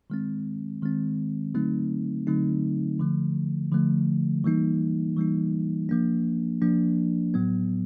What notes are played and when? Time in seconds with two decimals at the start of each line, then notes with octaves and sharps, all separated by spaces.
0.10 D#3 G#3 C4
0.82 D#3 G#3 C4
1.55 D3 F#3 A3 C4 D#4
2.27 D3 F#3 A3 C4 D#4
2.99 D3 F3 A3
3.72 D3 F3 A3
4.44 E3 G3 A#3 D#4
5.17 E3 G3 A#3 D#4
5.89 F3 A#3 D4
6.62 F3 A#3 D4
7.34 A2 F#3 B3